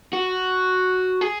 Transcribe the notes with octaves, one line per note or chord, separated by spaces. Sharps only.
F#4
G#4